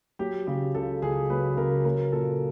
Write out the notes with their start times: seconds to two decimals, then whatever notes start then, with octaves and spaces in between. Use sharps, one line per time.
0.19 F#3 G4
0.47 C#3 G4
0.75 C#2 A4
1.02 C#2 G#4
1.30 F#3 B4
1.57 C#3 A#4
1.85 F#3 A#4
2.12 A#2 A4